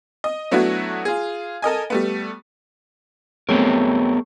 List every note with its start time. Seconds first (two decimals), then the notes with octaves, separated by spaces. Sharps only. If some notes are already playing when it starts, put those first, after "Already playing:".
0.24 D#5
0.51 F#3 A3 B3 D4 E4 F#4
1.05 F4 G#4
1.62 A4 A#4 D#5 G#5
1.90 G3 A3 B3
3.49 F#3 A3 B3 C4 G#4 A#4